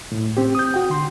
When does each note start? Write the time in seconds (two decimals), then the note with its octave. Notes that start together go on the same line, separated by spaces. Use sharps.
0.12 A2
0.37 C4 G4
0.55 D#6 G6
0.74 F#4 G5
0.90 D3 C6